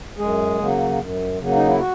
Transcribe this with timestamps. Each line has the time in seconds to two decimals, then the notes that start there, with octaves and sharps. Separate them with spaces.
0.18 F#2 G#3 G#4
0.59 C#3 F#3 A#3
0.98 F#2
1.39 C#3 F#3 A#3
1.55 D#4
1.68 E4
1.79 F#4